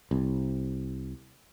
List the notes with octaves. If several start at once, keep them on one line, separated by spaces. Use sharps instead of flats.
C2